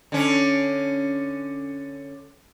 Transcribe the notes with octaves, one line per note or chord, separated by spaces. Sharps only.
D3 C#4